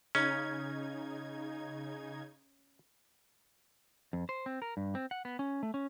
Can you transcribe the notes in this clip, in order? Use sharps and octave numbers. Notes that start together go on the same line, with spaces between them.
C#3 C#4 D#4 G#6
F2
C5
C4
A#4
G2
C4
F#5
B3
C#4
A3
C#4